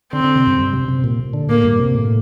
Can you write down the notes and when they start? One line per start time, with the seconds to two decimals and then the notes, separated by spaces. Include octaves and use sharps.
0.13 D3 C4
0.24 D3
0.36 C3
0.47 G2
0.59 G2
0.74 C3
0.88 C3
1.04 A#2
1.33 D3
1.49 A2 A#3
1.64 G2
1.79 C3
1.94 A2